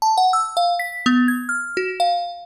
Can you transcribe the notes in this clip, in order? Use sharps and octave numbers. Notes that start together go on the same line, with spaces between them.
A5
F#5
E6
F5
B6
B3
G#6
F6
F#4
F5